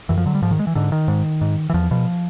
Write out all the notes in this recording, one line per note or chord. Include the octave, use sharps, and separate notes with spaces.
F#2 E3
F3
D3 F#3
G3
G#2 F3
D#3
G#3
E3
G#2 D3
D#3
G#2
G#2
E3
E2 F3
B2 F3